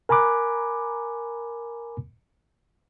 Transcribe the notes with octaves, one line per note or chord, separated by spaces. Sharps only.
A#4 G#5 A#5 B5 D6 F#6